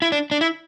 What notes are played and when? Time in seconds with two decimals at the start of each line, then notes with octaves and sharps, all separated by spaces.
0.02 E4
0.12 D4
0.31 D4
0.41 E4